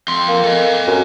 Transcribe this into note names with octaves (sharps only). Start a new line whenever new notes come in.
F2 C6
A#3
A4 D#5
F#2